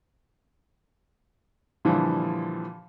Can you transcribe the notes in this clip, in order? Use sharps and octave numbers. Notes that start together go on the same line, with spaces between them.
A#2 D3 E3 F3 G3